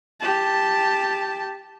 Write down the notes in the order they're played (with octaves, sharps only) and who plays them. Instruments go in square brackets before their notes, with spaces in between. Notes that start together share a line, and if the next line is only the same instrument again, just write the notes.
[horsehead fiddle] G4 A5